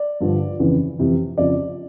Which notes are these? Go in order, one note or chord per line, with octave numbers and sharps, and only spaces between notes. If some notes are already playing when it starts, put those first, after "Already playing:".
Already playing: D5
G2 D3 F3
F2 C#3 E3
F2 C3 E3
F2 C#3 F3 D5